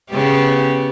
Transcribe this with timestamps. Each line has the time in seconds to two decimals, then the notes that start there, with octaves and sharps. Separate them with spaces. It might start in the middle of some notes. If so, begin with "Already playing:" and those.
0.10 C#3 B3 G4